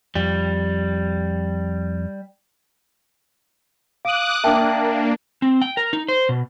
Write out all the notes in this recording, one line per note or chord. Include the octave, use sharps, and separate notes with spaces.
F2 G3
F5 D6 D#6 F#6
A#3 D4 E5 G5 A5
C4
G5
A#4
D#4
C5
B2